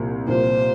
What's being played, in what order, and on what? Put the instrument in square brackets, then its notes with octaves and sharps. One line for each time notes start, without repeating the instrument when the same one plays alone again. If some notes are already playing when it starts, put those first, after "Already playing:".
Already playing: [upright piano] C2 A#2 F3 A#3
[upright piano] C2 A#2 F3 A#3 [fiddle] C5